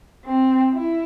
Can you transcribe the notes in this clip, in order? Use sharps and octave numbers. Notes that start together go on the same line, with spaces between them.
C4
E4